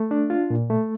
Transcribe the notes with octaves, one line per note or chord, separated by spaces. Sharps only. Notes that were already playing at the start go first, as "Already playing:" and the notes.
Already playing: A3
D4
F4
A#2
A3